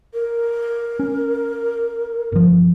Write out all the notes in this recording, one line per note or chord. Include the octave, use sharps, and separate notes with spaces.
A#4
C#4
G1 F3